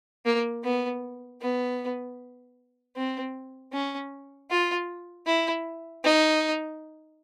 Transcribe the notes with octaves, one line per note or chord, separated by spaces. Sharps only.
A#3
B3
B3
C4
C#4
F4
E4
D#4